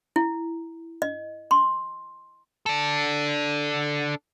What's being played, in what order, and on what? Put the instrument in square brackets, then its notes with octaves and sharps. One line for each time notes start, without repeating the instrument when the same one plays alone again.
[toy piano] E4
D#5
C6
[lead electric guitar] D4 A4